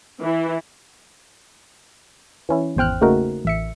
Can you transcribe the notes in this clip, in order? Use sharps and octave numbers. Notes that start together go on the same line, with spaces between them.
E3
E3 C#4 E4
G#1 E2 C5 G5 F6 F#6
C#3 A3 A#3 D#4 F#4 A#4
A1 E5 C#7